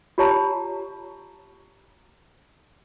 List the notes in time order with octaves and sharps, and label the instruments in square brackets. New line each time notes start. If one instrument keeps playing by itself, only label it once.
[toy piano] F4 G4 C#5 A5 A#5